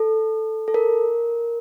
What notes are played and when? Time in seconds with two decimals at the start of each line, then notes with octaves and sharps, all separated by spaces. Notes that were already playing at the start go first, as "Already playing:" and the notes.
Already playing: A4
0.68 A4
0.74 A#4